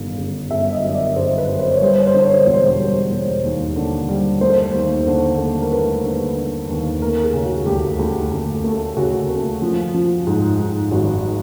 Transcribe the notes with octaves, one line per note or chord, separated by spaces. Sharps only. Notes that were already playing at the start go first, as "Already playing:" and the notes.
Already playing: G1 D#3
G1
G1 E5
D#5
F#2
D5
G1 C5
B4
F#2
C5
C#5
G3 C5
C#5
C5
D3 C#5
C5
E1 C#5
C5
G3
E1
D#2
D3
G3
A3 C5
D#2
D3
A3
A#4
A3 B4
D3
D3
D#2
A3 A#4
G#4
C#3
F#4
D2 G4
D2
D2
A3
C#3 F#4
A3
F3
F3
G#2
G#2
G#1 F#4